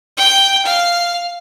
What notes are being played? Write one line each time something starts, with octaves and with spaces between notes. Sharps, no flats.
G5
F5